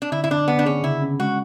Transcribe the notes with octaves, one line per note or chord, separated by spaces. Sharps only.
D4
D3 E4
E4
D3 D4
D3 B3
D4
C#4 G#4
C#3 E4
C#4
G#3 F#4